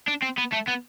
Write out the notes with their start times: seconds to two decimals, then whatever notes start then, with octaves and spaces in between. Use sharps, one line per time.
0.08 D4
0.23 C4
0.38 B3
0.53 A3
0.68 B3